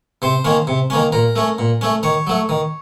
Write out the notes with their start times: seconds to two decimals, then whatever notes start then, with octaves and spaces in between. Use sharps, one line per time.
0.22 C3 C5
0.45 D#3 A#3 C#4
0.67 C3
0.90 D#3 A#3 C#4
1.12 A#2 A#4
1.36 A3 C#4
1.59 A#2
1.81 A3 C#4
2.03 D#3 C#5
2.27 F#3 A3
2.49 D#3